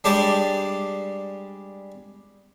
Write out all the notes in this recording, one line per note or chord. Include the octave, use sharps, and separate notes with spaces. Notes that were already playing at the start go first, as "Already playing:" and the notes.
G3 G#3 D4 G4 C5 D5